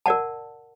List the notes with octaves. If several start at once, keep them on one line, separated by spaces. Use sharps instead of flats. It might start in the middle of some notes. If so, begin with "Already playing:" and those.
A#4 D5 F#5 A5